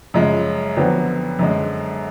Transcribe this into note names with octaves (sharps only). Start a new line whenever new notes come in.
F#2 C#3 F3 G#3
F2 D3 F#3 B3
F#2 D3 G#3